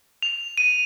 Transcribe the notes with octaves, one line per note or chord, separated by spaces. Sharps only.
F7
D#7